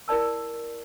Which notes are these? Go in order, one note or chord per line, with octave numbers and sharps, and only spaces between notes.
E4 A#4 D5 A5 E6